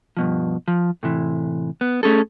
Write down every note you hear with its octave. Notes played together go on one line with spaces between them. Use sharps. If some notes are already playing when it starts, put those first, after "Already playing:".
G2 B2 F3
F3
A2 C3 E3
B3
A3 C#4 G#4 A4